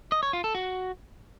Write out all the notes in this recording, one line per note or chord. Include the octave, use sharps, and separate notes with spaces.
D#5
C#5
F4
A4
F#4